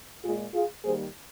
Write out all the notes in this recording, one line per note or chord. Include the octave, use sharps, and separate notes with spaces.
A#2 G#3 F4 G#4
F4 G#4
D#3 G3 A#3 G#4 C5